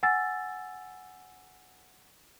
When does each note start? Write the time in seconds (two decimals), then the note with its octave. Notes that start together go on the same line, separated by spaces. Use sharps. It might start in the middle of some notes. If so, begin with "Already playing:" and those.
0.03 F#5 G#5 E6 A6